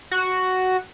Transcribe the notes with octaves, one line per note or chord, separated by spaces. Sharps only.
F#4